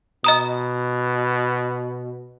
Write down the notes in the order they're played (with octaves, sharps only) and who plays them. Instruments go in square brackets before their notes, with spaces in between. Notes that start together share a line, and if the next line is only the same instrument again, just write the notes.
[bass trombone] B2 [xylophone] D#5 A#5 D#6